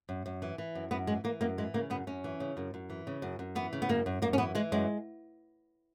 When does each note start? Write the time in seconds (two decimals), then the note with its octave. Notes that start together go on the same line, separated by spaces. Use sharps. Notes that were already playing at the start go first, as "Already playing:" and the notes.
0.09 F#2
0.26 F#2
0.42 E3
0.58 E3
0.75 F#2
0.91 F#2 B3
1.07 E3 G#3
1.24 E3 A#3
1.41 F#2 A#3
1.58 E3 G#3
1.74 C#3 A#3
1.90 F#2 B3
2.07 F#2 C#4
2.24 E3
2.40 C#3
2.57 F#2
2.74 F#2
2.90 E3
3.07 C#3
3.22 F#2
3.39 F#2
3.55 E3 B3
3.73 C#3
3.82 B3
3.89 F#2 A#3
4.06 F#2
4.22 F#2 A#3
4.33 C#4
4.38 E3 B3
4.55 E3 G#3
4.72 F#2 G#3